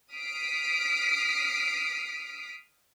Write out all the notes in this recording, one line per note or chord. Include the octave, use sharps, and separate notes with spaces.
D#6 F6 B6 C7 D7